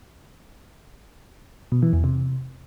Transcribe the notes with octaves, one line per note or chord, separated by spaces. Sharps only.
B2
E3
E2
C3